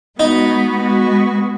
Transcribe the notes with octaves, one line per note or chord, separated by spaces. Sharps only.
G#3 B3 D#4 F#4
G#3 B3 F#4